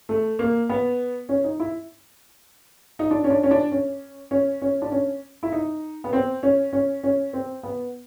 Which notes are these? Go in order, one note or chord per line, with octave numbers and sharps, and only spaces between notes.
A3
A#3
B3
C#4
D#4
E4
D#4
D4
C#4
D4
C#4
D4
C#4
C#4
C#4
D4
C#4
E4
D#4
B3
C4
C#4
C#4
C#4
C4
B3